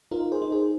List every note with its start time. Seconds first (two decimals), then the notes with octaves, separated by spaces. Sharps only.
0.11 D#4 F4 A#4
0.32 G#4 C5
0.42 D#4
0.52 G#4 C5